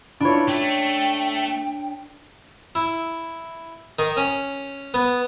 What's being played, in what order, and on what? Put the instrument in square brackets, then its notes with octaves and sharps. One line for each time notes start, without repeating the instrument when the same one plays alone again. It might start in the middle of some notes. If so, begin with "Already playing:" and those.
[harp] D4 C#5 [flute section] E4 F4 B5
[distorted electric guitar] A3 [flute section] G5
[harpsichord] E4
D#3
C#4
B3